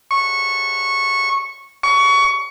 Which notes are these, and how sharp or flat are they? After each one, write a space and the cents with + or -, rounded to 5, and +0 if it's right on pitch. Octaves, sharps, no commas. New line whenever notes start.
C#6 -10
C#6 +25